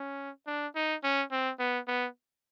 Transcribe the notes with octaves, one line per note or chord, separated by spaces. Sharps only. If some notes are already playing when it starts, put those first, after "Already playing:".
Already playing: C#4
D4
D#4
C#4
C4
B3
B3